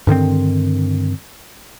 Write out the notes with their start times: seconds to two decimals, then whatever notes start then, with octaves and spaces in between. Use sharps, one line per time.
0.07 G2 D3 D#3 C4